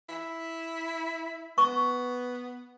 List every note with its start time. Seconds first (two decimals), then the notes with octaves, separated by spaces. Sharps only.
0.09 E4
1.58 B3 C#6